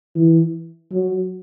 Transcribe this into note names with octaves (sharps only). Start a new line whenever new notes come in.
E3
F#3